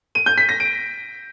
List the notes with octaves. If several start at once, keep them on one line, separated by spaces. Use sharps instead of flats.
D#7
G6
B6
A#6
D7